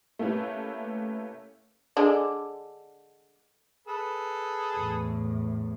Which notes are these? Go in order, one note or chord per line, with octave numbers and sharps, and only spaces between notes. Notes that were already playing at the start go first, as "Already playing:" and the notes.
A3 A#3 C#4 E4 G4 B4
D3 G#3 D4
G#4 A4 B4
E2 A2